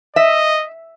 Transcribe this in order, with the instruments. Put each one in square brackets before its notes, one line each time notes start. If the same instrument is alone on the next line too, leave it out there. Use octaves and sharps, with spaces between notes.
[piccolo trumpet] D#5 [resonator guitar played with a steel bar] E5